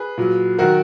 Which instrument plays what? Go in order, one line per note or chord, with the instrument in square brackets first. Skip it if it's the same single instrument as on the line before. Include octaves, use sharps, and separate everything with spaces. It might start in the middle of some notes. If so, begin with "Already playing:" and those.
Already playing: [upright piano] G#4 B4
A#2 F#3
D#3 F#3 F#4 A#4